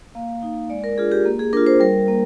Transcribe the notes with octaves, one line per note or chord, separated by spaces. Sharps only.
A#3 F5
D#4
G#3 D5
A#4
D4 F4 G#4
G4
A#3
G#4
D4 F4 A#4
C5
G3 A#4
A#3